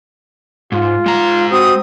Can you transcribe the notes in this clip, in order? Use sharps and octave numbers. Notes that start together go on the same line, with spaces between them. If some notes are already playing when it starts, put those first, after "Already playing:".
G#2 F4
G#3 A#5
C4 F#4 D#6